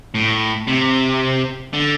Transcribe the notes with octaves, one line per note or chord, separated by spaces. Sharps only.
A2
C3
D3